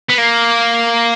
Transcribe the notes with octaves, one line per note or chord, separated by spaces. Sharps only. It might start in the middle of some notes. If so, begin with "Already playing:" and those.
B3
A#3